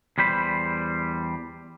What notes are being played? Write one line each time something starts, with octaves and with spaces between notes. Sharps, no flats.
E2 G3 C5 B5